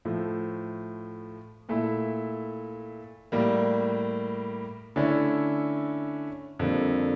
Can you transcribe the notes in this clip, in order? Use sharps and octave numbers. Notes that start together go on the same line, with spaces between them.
A2 F3 A3
A#2 A3 E4
A2 G3 A#3
D3 A3 C#4 E4
F2 D3 G3 A#3